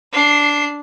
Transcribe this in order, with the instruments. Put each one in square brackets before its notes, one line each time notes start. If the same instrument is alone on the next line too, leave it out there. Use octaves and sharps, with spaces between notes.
[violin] D4 C7